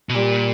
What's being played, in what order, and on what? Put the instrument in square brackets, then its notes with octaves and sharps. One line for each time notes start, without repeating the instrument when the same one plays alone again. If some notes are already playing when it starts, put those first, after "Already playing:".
[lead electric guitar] B2
[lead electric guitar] A#2 [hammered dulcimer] G3